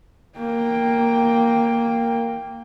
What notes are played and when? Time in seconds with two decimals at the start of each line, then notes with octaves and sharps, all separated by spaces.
0.38 A#3 G5